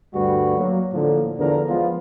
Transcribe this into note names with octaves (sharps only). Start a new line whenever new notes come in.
D2 G2 G3 F#4 B4
F#3 A#3
A2 D3 F3 A#3
E2 D3 F3 D4 A#4
F3 G#3 B3 F4